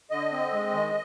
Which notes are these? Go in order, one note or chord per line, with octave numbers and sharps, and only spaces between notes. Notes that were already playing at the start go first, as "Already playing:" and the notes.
D3 D#5
C4
G#3
D#3